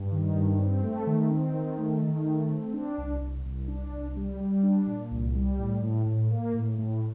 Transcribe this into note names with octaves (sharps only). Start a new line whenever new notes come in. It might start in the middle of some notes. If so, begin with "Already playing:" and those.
Already playing: G2
D#3
G2
C4
A3
D#3
C4
D#3
A3
D#3
A3
C4
D4
C2
C2
C2
D4
C2
G3
G3
D4
A#2
C2
G3
A2
A2
A2
A#3
A2
A2